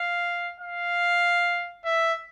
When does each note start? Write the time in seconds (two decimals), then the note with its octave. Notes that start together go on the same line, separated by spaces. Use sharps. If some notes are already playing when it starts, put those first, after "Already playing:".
Already playing: F5
0.60 F5
1.85 E5